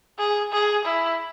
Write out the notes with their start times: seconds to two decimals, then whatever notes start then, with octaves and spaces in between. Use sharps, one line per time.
0.19 G#4
0.53 G#4
0.85 E4